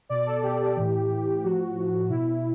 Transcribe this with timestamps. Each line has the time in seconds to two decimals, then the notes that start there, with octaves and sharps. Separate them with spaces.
0.09 B2 D5
0.26 A4
0.43 B2 G4
0.76 A2 E3
1.10 A2 E3
1.43 A2 F3 F#4
1.76 A2 F3
2.10 B2 E4